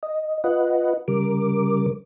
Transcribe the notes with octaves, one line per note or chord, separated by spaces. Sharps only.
D#5
F4 B4 D#5 F#5
C#3 G3 A#4 D6